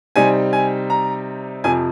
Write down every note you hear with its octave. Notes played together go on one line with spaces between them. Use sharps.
C3 G3 C4 D#4 G#5
G#5
A#5
F2 C3 F3 G#5